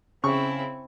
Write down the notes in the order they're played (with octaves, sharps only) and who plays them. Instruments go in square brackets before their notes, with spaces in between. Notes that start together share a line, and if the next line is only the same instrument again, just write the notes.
[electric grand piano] C#3 [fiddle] C4 E4 [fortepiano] C#6